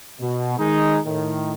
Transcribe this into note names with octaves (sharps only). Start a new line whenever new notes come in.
B2
D#3 G#3 D#4
A2 D#3